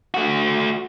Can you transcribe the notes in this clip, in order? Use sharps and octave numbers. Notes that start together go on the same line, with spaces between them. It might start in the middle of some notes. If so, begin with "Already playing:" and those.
A3 F#4